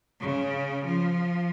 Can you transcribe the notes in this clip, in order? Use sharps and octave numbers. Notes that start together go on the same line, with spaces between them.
C#3
F3